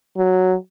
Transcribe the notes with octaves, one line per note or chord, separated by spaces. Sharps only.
F#3